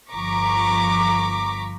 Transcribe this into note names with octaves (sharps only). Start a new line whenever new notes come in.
G1 F3 A#5 C#6 D6 B6